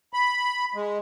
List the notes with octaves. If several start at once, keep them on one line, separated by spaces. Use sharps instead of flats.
B5
G#3